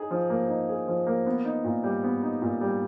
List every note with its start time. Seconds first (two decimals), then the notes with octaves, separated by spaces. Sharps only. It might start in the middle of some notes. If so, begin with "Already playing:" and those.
Already playing: D#4 G#4
0.11 F3
0.30 A#3
0.48 D#4
0.69 G#4
0.88 F3
1.07 A#3
1.26 B3
1.45 D#4
1.64 A#2
1.84 G3
2.04 B3
2.23 D#4
2.42 A#2
2.61 G3